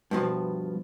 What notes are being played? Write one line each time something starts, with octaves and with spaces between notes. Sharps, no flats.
G2 B2 F3